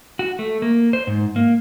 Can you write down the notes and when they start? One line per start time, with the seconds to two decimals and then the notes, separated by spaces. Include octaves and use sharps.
0.19 F#4
0.39 A3
0.62 A#3
0.93 C5
1.07 G#2
1.36 A#3